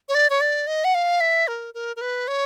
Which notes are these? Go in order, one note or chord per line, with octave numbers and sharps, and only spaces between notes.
C#5
D5
C#5
D5
D#5
F#5
F5
E5
A#4
A#4
A#4
B4
C#5